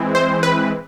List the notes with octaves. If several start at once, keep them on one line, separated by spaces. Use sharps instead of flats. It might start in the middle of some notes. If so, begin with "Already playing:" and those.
Already playing: E3 G#3 C4 E4
C5
B4